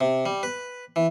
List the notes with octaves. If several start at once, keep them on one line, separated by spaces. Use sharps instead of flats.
C3
G3
B4
E3